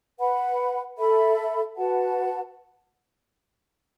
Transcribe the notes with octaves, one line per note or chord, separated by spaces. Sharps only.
B4 F#5 B5
A4 E5 B5
F#4 B4 F#5 A5